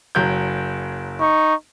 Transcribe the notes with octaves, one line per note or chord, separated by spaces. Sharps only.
F#1 F#3 G6
D#4 C#6